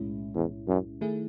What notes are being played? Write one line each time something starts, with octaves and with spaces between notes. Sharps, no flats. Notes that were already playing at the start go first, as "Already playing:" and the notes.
Already playing: B1 A2 G#3 C#4 E4
E2
F#2
D#3 A3 E4 G#4